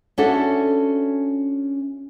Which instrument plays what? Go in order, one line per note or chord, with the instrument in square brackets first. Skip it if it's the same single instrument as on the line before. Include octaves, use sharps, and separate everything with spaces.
[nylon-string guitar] C#4 D4 F#4 A4 E5